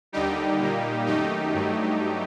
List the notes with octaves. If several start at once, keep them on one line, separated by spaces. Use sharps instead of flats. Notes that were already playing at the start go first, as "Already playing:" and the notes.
D#2 D3 G3 D#4 G4
A#2 G3 A#3
F#2 D#3 A3 D#4 G4
G2 F#3 A3